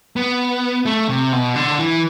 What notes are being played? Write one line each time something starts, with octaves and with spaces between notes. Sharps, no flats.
B3
A3
C3
B2
D3
E3